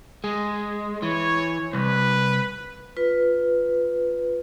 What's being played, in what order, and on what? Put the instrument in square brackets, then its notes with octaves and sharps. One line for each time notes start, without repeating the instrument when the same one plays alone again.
[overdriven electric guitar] G#3
[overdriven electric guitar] E3 [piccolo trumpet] C#5
[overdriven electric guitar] C2 [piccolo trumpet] B4
[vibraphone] F4 B4